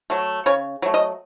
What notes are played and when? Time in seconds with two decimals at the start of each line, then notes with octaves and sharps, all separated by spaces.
0.10 F#3 A3
0.46 C#3 C#5
0.82 F#3 A3
0.94 D#5